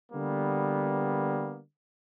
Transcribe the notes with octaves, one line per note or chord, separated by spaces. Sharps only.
D3 G3 A#3 B3